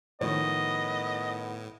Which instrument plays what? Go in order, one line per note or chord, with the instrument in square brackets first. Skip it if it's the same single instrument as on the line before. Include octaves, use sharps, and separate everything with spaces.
[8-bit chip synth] A2 [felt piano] D#3 F3 C#5 [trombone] B3 [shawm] D#5